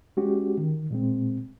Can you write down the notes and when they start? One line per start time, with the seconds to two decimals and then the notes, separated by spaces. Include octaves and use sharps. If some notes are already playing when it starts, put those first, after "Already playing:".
0.17 G#3 C#4 F#4 G4
0.58 D#3
0.91 A#2 G#3 C4